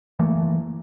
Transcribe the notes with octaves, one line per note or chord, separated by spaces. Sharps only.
F#1 E3 A3 A#3